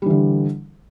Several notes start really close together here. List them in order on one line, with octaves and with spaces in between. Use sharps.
G3 E3 D3